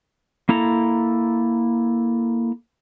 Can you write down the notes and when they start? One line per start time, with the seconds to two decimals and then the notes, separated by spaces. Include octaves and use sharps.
0.49 A#3 E4 A4 A#5